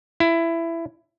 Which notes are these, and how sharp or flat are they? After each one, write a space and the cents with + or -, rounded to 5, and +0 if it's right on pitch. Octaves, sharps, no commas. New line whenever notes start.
E4 +15